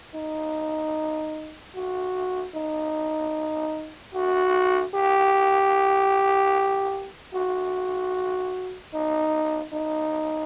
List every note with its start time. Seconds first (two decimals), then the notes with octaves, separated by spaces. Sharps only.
0.15 D#4
1.75 F#4
2.54 D#4
4.14 F#4
4.94 G4
7.34 F#4
8.94 D#4
9.73 D#4